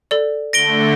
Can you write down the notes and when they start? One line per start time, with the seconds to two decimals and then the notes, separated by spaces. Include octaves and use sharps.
0.11 A4 D5
0.53 D3 A3 A#6 D7 G7